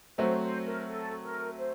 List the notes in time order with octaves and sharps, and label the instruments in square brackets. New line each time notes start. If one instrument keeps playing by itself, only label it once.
[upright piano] F#3 A3 C4 F#4 [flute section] C5
[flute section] C5
A#4
A4
A#4
C5